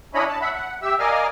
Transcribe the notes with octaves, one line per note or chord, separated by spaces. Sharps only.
C#4 D4 E4 C#5 D#5 B5
A5
E5 F#5 B5
F#5
G4 E5 E6
A#4 D5 D#5 F5 G#5 F6